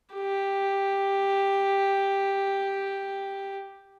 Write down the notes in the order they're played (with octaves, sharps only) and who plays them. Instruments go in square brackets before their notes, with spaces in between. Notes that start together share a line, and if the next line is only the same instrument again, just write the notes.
[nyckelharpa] G4